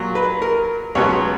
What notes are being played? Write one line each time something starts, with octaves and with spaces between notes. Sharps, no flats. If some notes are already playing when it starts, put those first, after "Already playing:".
Already playing: A#2 F#3
B4
A#4
C#2 B2 F#3 C#5